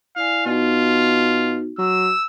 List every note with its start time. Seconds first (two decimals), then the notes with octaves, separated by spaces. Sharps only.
0.16 E4 D5 F5 G#5
0.46 B2 B3 D#4 F4 F#4
1.79 F#3 E6